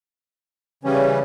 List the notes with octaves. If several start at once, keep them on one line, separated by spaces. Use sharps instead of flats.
C#3 E3 G3 C#4